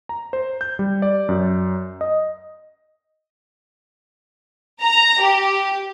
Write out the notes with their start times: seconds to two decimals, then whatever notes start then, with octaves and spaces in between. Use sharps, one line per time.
0.09 A#5
0.33 C5
0.61 G6
0.79 G3
1.02 D5
1.29 F#2
2.01 D#5
4.81 A#5
5.21 G4